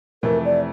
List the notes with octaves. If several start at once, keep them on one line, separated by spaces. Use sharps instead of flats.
F2 C3 E3 A3 A#4
D5